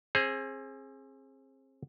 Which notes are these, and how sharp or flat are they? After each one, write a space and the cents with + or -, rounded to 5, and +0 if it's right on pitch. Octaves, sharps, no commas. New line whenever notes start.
C4 +35 G#4 +0 C5 +35